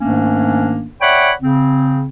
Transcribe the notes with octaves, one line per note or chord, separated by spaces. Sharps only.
G#2 D#3 A3 A#3 C#4 D4
C#5 D5 E5 F#5 G5 B5
C#3 C4